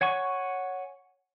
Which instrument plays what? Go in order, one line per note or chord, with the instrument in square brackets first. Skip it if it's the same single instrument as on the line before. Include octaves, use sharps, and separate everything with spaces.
[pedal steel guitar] C#5 F#5 G#5 C#6